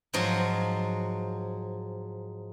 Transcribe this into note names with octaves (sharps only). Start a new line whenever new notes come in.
G#2 F3 F#3